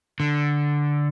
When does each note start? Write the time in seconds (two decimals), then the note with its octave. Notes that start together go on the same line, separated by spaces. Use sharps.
0.20 D3